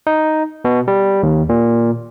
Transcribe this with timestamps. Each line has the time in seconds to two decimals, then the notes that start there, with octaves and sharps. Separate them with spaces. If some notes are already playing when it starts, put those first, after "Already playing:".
0.07 D#4
0.65 B2
0.88 G3
1.23 D#2
1.49 A#2